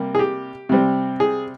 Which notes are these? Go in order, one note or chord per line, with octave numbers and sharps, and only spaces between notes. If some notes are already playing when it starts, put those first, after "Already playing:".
Already playing: C3 G3 A#3
G#4
G4
C3 G3 C4
G#4